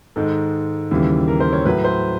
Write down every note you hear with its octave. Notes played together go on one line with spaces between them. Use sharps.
G#2 D#3 G#3 A4
D#2 C#3 E3 G3
A#4
C5
C#5
A2 F#3 B4
C5